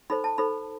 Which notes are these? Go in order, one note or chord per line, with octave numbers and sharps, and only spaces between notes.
D#4 A4 C5 B5
A5
D#4 A4 C5 B5